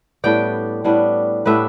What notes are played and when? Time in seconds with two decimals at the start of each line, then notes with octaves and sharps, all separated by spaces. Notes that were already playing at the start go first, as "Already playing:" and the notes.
0.24 A2 G3 B3 D4 D5 G5
0.84 A2 G3 B3 D4
1.46 A2 G3 B3 D4 B4 E5